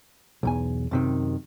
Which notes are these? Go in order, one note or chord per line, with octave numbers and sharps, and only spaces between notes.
B1 E2 G#5
F#2 C3 D#3